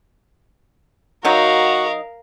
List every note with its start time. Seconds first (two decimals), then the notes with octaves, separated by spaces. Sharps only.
1.25 F#3 D#4 F#4 A#4 F5